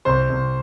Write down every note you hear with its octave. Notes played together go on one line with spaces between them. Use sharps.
C2 C5
C2